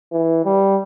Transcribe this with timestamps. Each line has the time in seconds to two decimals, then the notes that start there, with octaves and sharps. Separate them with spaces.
0.12 E3
0.45 G3